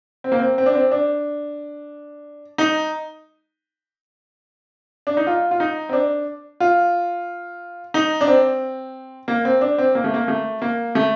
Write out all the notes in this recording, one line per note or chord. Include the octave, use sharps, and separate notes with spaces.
C4
A#3
C4
C4
D4
C4
D4
D#4
D4
D#4
F4
F4
D#4
C4
D4
F4
D#4
D4
C4
A#3
C4
D4
C4
A#3
A3
A#3
A3
A#3
A3